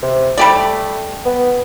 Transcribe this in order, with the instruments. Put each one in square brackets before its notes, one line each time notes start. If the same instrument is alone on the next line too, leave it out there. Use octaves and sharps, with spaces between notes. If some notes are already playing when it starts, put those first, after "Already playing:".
[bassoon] C3
[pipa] G3 G4 D5 [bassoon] A3
[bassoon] B3